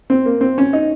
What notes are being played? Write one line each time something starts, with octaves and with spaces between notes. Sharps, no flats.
C4
A#3
C4
C#4
D#4